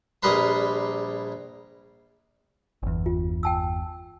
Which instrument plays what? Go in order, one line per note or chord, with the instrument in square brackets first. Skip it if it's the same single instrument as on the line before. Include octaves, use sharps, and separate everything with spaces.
[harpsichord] A#1 G3 G#4 A#4 B4 C6
[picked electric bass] G1 E2
[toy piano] F4
G5 A5 E6